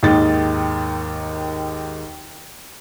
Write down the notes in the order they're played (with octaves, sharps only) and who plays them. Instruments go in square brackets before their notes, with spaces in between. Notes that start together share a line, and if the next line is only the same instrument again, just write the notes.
[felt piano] D#2 G#2 D#3 D#5 A6